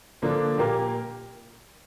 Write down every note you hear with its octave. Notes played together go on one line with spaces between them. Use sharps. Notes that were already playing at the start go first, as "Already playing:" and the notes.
D3 F3 A#3 D4
A#2 A#3 G4 A#4